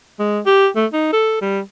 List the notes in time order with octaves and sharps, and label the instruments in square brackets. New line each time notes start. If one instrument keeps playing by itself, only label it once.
[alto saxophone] G#3
G4
A3
D#4
A4
G3